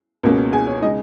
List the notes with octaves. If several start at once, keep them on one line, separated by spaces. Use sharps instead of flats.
C#2 B2 A#3 C#4
G#4 G#5
C#5
C#3 G#3 D#4 D#5